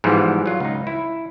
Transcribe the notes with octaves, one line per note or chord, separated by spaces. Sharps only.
G#2 E3 F3 G3 B3
F#3 F4
C#2 D#4
E4